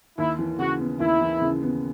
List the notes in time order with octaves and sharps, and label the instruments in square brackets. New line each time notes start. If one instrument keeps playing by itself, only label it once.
[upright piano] D#2 [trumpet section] E4
[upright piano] E3
[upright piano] C#3 [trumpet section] F#4
[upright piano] B3
[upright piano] D#2 [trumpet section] E4
[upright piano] E3
C#3
B3